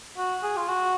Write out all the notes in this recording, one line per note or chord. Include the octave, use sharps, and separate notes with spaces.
F#4
G#4
F4
F#4